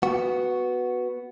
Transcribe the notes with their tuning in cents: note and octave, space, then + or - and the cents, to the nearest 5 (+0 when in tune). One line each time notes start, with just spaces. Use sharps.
B3 +0 F#4 +0